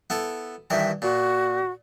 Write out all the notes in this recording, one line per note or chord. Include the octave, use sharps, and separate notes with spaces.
B3 E4 A4
G2 D#3 E3 E5
A#2 F#4